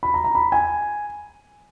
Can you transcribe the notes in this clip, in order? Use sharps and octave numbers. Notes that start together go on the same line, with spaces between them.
B5
A#5
A#5
B5
G#5